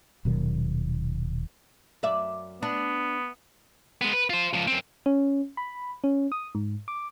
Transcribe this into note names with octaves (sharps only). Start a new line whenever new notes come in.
D#1 B2 D#3 F#3
F#2 D5 E5
B3 D4
G#3 B3
B4
F4 C5
C#2 F3
F#2 C4
C#4
B5
C#4
D#6
G#2
D6